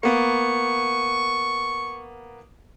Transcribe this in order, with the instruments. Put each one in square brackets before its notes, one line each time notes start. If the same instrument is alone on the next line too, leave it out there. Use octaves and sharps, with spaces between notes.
[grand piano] A#3 B3 [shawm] C#6